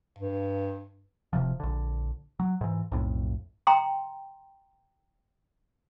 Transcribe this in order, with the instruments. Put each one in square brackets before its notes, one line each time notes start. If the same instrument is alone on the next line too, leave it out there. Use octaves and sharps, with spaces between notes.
[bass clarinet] G2
[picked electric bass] D1 C3 F3
A#1 D3
F#3
G#2 E3
B1 F2 A2
[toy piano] G5 A#5 C6